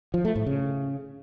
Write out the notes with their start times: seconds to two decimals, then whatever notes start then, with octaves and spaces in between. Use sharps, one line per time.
0.14 F3
0.25 A3
0.36 A2
0.46 C#3